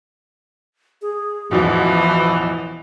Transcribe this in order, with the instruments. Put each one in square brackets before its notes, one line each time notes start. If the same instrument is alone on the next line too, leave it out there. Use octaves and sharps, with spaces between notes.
[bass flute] G#4
[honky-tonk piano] A1 E2 B2 [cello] E3 [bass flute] F3